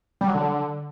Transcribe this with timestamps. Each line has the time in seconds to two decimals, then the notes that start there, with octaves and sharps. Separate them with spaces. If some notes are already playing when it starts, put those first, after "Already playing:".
0.21 G3
0.28 F#3
0.34 D3